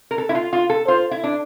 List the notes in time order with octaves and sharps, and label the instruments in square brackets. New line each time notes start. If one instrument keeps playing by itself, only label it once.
[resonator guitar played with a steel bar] A#4
A4
E4
F4
F4
A4
[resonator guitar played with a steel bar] F4 [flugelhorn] C5
[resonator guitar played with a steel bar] E4
D4